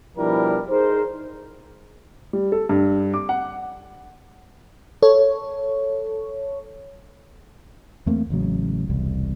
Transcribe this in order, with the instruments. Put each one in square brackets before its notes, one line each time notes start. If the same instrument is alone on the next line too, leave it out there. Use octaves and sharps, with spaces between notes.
[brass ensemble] B2 F3 G3 D4 E4 A#4
D#4 G#4 A#4 C5
[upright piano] G3
A4
G2
D6
F#5
[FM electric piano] A4 C#5
[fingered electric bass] E2 A3 A#3 C4
A1 C#3 F#3
E1 C2